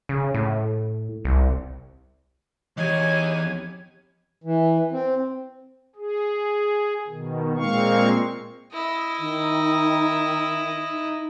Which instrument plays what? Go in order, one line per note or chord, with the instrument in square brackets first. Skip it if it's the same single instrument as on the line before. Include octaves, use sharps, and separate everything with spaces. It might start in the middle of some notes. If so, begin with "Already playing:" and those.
[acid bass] C#3
A2
C2
[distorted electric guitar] E2 [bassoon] D#4 [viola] G4 G#5 [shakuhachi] C#5
[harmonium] E3
C4
[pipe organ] G#4
B2 D#3
A#2 G#3 A#3 C4 F5 C#6
[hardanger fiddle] E4 D#5
[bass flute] D#3
D#4